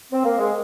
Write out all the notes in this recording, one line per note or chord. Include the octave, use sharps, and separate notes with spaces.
C4
A#3
G#3